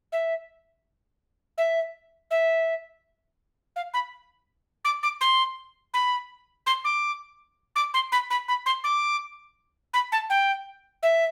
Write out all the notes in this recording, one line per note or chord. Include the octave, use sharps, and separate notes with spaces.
E5
E5
E5
F5
B5
D6
D6
C6
B5
C6
D6
D6
C6
B5
B5
B5
C6
D6
B5
A5
G5
E5